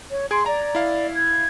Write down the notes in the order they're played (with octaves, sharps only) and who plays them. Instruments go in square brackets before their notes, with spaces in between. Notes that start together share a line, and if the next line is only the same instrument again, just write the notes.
[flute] C#5
[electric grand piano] G#4 G#6 D7 [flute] C6
[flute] D5 [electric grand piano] A#5
[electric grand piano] E4 F5
[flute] G#6